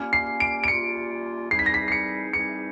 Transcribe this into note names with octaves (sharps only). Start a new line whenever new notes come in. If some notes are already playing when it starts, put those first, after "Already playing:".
Already playing: G3 A#3 C#4 F4
C7
D7
D7
G3 A#3 C#4 F4 C#7
E3 G3 C4 D#4 G#4 C7
B6
A#6
B6
C7
C#7
E3 G3 C4 D#4 G#4 C#7